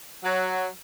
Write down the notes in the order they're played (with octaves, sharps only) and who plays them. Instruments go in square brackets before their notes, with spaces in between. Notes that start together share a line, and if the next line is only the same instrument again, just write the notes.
[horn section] F#3